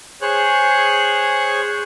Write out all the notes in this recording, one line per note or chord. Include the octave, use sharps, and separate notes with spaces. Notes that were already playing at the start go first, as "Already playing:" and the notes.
G#4 C5 C#5 F#6